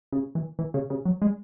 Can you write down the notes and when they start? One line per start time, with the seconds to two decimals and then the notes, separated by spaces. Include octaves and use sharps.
0.12 C#3
0.35 E3
0.59 E3
0.74 C#3
0.90 C#3
1.05 F#3
1.22 G#3